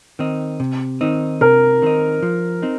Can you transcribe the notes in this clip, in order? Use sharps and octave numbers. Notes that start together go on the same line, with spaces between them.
D#3 C4 D#4
C3
D#3 C4 D#4
C3 A#4
D#3 C4 D#4
F3
C4 D#4